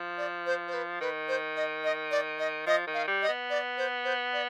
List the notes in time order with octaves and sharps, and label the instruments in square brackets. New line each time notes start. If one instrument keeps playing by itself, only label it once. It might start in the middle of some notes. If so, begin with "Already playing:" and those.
Already playing: [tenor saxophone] F3
[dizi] D5
C5
C5
B4
[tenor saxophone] D#3 [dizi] B4
[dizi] C5
D#5
D#5
D5
D#5
[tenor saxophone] F3 [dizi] D#5
[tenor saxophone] D#3
[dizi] F5
[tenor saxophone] G3
[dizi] D#5
[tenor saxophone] B3
[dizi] D5
C5
C5
D5